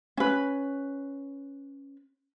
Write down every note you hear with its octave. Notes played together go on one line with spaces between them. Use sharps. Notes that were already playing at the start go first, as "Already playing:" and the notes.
C#4 B4